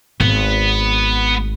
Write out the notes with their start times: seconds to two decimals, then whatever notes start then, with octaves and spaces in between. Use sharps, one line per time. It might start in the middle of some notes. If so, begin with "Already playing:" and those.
0.20 G#1 B3